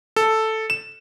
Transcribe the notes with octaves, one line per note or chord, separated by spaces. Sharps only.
A4
E7